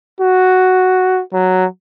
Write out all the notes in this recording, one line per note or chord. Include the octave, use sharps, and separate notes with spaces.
F#4
F#3